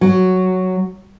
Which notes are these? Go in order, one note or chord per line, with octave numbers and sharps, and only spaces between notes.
F#3